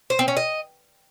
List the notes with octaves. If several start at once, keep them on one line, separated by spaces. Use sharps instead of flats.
C5
C4
C#4
D#5